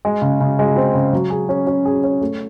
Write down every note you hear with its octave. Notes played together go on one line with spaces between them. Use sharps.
G#3
C#3
C#3
G#3
C4
C#3
F#3
G#4
C#4
C#4
G#4
C#5
A3